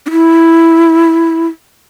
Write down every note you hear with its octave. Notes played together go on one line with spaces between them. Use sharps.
D4
E4